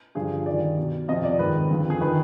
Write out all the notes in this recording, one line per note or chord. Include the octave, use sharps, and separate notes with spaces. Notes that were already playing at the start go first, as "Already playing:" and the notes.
G2 D3 F3 G#4
G2 D#3 D5
B2
F2 C3 F3 D#5
D5
G#2 D#3 B4
F2 D3 F3
G#4
D#3 B4